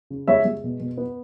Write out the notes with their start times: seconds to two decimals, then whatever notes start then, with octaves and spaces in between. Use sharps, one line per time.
0.10 C#3
0.28 G#3 C#5 E5
0.45 G#3
0.64 B2
0.80 B2
0.97 B3